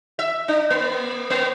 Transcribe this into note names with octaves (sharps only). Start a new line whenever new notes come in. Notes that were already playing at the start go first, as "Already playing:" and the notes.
E5
D4
A#3
A#3